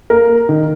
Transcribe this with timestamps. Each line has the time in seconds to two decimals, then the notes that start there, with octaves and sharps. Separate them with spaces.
0.10 A#3 A#4
0.49 D#3